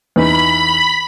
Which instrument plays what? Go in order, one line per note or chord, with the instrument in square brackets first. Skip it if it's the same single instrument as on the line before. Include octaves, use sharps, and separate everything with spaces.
[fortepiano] E2 E3 D#4 [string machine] B5